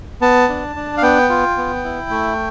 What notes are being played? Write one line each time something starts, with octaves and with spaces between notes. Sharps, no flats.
B3 A5
D4
D4
F5
B3 G5
F4
B3
E4
A3